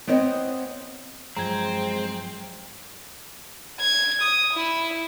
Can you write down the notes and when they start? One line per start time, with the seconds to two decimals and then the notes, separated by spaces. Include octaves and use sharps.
0.07 B3 C4 C#5 D#5 F#5 G5
1.37 G2 F3 F#3 G#3 C4 C5 A#5 G#6
3.80 G#6
4.21 D#6
4.53 E4